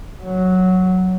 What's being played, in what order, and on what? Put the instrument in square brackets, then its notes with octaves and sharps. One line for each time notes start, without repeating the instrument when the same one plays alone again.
[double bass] F#3